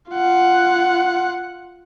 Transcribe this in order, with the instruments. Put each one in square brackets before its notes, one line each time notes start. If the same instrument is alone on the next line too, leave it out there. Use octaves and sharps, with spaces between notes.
[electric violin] F4 F#5